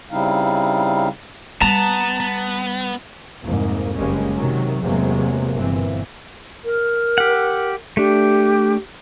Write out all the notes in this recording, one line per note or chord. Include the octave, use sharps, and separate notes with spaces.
C#3 G3 C4 D#4 E4 F5
G3 B3 A5 A#5
B3
C2 F2 G#2 A#3
F#1 G3 G#3 A#3 C#4
C3 D#3 F#3
E2 A2 C3 F#3 G#3 A#3
G1 A#2 E3 C4
A#4
G4 F#5
A3 D4 G4